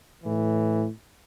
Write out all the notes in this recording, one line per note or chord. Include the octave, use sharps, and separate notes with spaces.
A2 E3